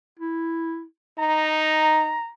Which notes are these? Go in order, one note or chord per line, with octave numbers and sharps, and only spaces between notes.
E4
D#4 A#5